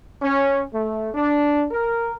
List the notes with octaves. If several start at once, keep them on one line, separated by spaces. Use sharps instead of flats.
C#4
A3
D4
A#4